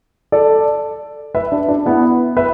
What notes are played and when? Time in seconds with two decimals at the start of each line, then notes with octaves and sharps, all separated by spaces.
0.32 A4 D5
1.35 B4 E5
1.52 D4
1.68 D4
1.86 B3 E4
2.37 B4 E5